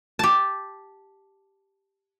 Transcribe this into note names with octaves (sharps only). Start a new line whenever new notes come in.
G4 A5